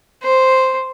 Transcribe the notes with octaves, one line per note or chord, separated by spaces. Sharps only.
C5